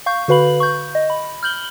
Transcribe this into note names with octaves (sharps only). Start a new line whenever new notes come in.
F5 C#6 G6
D3 F#4 B4 F5 B5 F#7
C#6 G6
D#5
B5
F6 G6 F#7 G7